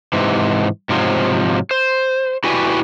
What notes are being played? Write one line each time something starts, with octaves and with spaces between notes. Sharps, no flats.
G#2 C3 E3
G#2 C3 F3 F#3
C5
E4 F#4 G4 B4 D5 G#5